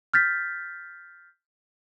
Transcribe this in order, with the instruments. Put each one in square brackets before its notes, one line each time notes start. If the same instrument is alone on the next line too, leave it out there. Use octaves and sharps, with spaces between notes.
[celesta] F6 G6 A6 B6